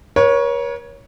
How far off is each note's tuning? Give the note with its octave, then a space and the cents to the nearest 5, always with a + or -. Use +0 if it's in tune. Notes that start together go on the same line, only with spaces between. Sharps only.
A#4 +45 C#5 +0